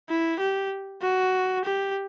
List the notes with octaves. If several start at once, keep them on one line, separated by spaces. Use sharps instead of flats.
E4
G4
F#4
G4